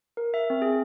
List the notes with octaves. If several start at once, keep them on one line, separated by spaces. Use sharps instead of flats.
A#4
E5
C4
G#4